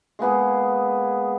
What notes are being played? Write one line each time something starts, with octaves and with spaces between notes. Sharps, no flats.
G#3 A#3 B3 G#4